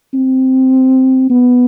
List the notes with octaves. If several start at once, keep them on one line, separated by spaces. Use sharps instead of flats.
C4
B3